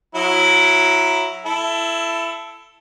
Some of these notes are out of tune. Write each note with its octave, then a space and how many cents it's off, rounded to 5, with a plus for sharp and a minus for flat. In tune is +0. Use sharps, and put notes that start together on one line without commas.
F#3 -15 E4 +10 A#5 +0
E4 +20 A4 +0